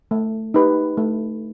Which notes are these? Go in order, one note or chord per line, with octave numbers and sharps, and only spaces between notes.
A3
D#4 G4 B4
A3